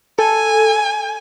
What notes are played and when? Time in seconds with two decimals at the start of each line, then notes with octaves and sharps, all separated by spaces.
0.19 A4 G#5